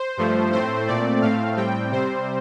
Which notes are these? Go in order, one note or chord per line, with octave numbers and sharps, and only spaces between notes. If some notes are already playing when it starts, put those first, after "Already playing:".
Already playing: C5
G2 F3 A3
A2 A3 C4 C5
A#2 A3 C4 D5
A2 A3 C4 F5
A2 G3 C4 G5
C3 G3 C4 C5